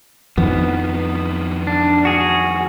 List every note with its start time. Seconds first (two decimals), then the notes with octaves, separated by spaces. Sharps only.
0.38 F2 D#3 F3 B3
1.67 D4
2.05 F#4 G#4